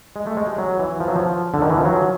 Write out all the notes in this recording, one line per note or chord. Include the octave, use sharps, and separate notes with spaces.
G#3
A3
G#3
G3
F#3
E3
F3
F#3
F3
D3
D#3
E3
F3
F#3